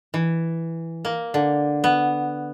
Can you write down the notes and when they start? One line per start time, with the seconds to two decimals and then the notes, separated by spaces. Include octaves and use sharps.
0.14 E3
1.05 A#3
1.34 D3
1.84 B3